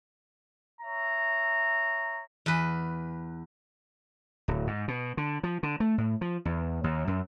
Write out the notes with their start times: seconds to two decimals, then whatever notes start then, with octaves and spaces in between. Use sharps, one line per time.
0.81 C#5 E5 A#5
2.46 E2 B4
4.48 D1
4.67 G#2
4.88 B2
5.17 D3
5.43 F3
5.63 D3
5.80 A3
5.98 A2
6.21 F3
6.45 E2
6.84 D#2
7.08 F#2